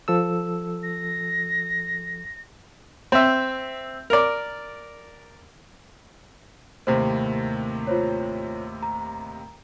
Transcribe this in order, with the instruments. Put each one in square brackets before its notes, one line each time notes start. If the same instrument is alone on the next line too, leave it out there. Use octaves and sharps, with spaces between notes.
[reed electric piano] F3 A4 E6
[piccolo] A#6
[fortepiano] C4 E5
A#4 D5
[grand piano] D#2 A2 C3 [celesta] C5
[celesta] F4 C5 C#5
A#5